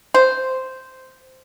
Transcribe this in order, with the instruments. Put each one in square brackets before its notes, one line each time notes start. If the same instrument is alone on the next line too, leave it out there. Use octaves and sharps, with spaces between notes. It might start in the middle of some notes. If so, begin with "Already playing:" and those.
[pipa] C5